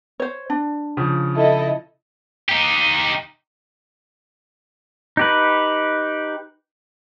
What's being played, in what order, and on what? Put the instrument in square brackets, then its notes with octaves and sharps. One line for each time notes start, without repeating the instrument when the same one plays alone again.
[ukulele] C5 C#5
D4
[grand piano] C#3 F3
[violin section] E4 A4 D#5
[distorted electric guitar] D#4 G4
[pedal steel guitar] D#4 G4 B4